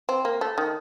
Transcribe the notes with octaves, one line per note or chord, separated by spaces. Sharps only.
C4
A#3
A3
D#3